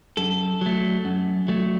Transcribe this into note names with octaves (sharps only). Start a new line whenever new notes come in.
F#2 A4
F#3 A3
F#2
F#3 A3